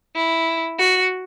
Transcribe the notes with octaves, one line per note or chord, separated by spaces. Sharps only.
E4
F#4